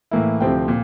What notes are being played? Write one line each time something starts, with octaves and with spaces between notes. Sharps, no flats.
A2 E3 A#3 E4
D2 C3 F3 C4 E4 G5
A#2